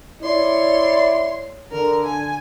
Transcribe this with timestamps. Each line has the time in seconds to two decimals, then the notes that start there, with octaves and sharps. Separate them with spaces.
0.21 E4 C#5 D5 C6
1.71 D3 A#4
2.06 G#5